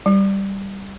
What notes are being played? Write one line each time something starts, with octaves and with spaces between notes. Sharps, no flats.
G3